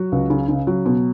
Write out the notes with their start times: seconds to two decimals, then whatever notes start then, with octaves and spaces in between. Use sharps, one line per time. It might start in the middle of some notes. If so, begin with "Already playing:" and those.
Already playing: F#3 F#4
0.12 C#2
0.30 C#3
0.49 C#3
0.67 F#3
0.86 B2